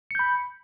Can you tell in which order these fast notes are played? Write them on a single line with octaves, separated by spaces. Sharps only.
C#7 G6 B5